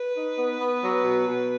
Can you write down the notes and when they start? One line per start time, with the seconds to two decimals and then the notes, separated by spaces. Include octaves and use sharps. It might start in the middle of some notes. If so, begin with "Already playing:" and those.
Already playing: B4
0.15 D#4
0.37 B3
0.59 B3
0.82 F#3
1.04 B2
1.26 B2